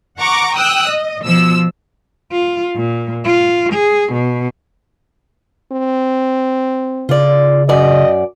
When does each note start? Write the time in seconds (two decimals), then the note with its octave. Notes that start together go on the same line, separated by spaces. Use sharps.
0.19 F#5 A#5 C#6 D6
0.54 G5 D#6 E6 F#6
0.89 D#5
1.25 B2 F3 E6
2.32 F4
2.75 A#2
3.25 F4
3.73 G#4
4.13 B2
5.72 C4
7.09 C#3 F4 D5
7.69 F#2 D5 D#5